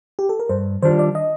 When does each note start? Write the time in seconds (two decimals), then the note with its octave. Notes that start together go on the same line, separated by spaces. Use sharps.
0.19 G4
0.29 A4
0.40 A#4
0.49 G2 C5
0.82 D#3 G3 D4 F4 C5
0.99 D5
1.15 D#5